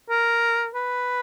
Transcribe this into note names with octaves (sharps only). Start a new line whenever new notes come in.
A#4
B4